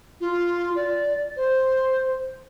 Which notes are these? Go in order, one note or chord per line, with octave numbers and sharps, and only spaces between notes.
F4
D5
C5